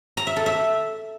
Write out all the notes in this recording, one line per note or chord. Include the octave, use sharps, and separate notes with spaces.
A#5
E5
A4
E5